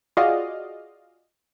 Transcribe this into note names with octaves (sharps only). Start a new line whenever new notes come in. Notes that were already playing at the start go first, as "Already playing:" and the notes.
F4 F#4 G#4 D5 D#5 F5